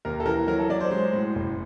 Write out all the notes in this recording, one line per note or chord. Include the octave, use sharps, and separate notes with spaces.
D#2 A#4
A4
E3 A#4
F#3 A#4
A4
F#3 D5
C5
G#3 C5
A2
F#1